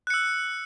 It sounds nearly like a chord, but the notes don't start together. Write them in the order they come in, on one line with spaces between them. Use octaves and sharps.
F#6 C#7 E6